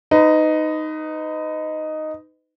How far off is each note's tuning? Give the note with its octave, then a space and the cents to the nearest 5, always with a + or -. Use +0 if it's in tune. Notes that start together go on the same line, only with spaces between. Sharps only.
D#4 +0 B4 +35